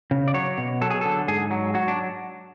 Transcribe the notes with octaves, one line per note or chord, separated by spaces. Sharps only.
C#3
D5
F#3 C#5
B2
F#3 A4
G#4
D3 A4
G#2 G#4
F#3
F#3 F#4
D4